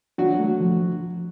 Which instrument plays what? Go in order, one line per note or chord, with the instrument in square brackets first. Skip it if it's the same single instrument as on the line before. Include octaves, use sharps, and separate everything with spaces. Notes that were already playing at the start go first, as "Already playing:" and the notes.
[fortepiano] F#3 F#4 [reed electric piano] D4
[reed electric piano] A3
F3